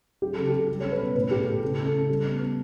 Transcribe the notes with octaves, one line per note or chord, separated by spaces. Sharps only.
F#3 G4
C#3 A4
G4
C#3
G3 A4
C#4 C#5
B4
B2
A2 B4
A2 G4
A4
A2
C#3 A4
C#3
A4
C#3
G3
B3
B3